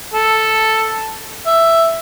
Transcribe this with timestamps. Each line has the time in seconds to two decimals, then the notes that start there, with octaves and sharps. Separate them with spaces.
0.13 A4
1.46 E5